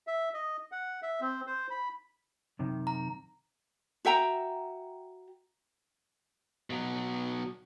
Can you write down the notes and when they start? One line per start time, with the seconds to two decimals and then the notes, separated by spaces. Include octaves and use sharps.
0.07 E5
0.34 D#5
0.72 F#5
1.02 E5
1.21 C4
1.47 C5
1.70 B5
2.59 F#2 C3 D#3
2.87 A#5
4.05 F#4 E5 G5 A#5
6.70 B2 F#3